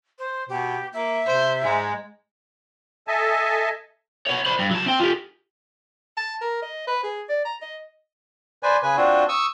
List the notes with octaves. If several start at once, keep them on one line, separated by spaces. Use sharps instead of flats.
C5
B2 G4
A#3 E5
C3 C5
G#2 G#3
A4 D#5 E5 G#5 A5
B3 C#5
C5 B5
G2
F#3 A5
C4 G5
F4 G4
A5
A#4
D#5
B4
G#4
D5
A#5
D#5
B4 C5 D5 G#5
C#3 B4 G#5
C4 D4 F4 F#4
C#6 D#6 E6